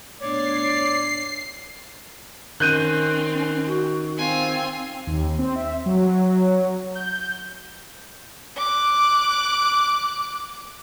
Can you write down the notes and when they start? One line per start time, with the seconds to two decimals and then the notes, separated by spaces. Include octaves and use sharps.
0.20 A2 B3 D4 C#5 D5 C7
2.60 D#3 C4 C#4 F#6 G6 D#7
3.67 F#4
4.18 C4 F4 G#5
5.07 D#2
5.39 C4
5.56 E5
5.86 F#3
6.95 G6
8.57 D6 F#6